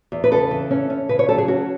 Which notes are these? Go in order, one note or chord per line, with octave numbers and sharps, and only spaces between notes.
E2
B4
C#3 A4
E3
C#4
C#4
C#3 B4
C#5
F#3 A4
G#4
C#4 F#4